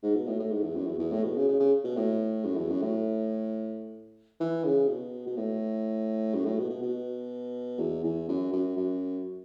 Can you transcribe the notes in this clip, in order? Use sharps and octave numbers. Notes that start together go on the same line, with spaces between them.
G#2
B2
A2
A2
G#2
E2
F#2
E2
E2
A2
B2
C#3
C#3
C#3
B2
A2
F#2
E2
F#2
A2
E3
C#3
B2
B2
A2
F#2
A2
B2
B2
B2
E2
E2
F#2
F#2
F#2